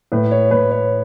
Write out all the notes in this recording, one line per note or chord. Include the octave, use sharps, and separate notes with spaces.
A2 B4
C#5
A2 B4
C#5